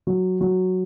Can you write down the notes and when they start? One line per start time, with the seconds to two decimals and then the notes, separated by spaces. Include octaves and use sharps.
0.07 F#3
0.41 F#3